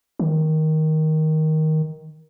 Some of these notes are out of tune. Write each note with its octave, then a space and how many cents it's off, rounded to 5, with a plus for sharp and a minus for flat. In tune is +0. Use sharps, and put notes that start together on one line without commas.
D#3 +10